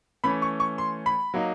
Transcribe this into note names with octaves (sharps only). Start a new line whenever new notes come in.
E3 A3 C#4 B5
C#6
C#6
C6
B5
F#3 A#3 D#4